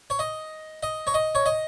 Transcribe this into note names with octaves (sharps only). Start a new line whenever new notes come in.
C#5
D#5
D#5
C#5
D#5
C#5
D#5